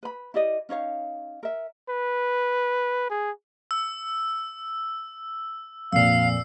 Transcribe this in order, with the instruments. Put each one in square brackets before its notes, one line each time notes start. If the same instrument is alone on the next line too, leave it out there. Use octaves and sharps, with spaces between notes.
[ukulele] B4 B5
E4 G4 D5 D#5
C#4 D#4 C#5 F5
A#4 E5
[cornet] B4
G#4
[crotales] E6
[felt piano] F2 A#2 [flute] F5 [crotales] E6 C7